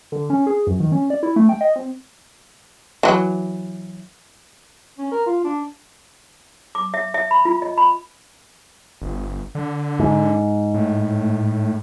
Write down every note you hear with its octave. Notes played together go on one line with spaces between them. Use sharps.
D3
C#4
G#4
F#2
D#3
C#4
D5
E4
A3
G5
D#5
C4
E3 F#3
C#4
A#4
F4
D4
D6
E5
E5
B5
F4
D#5
B5
G1
D3
G#2
A2